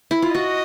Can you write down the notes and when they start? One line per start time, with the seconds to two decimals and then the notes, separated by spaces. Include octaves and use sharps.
0.11 E4
0.22 F4
0.34 F#4 D#5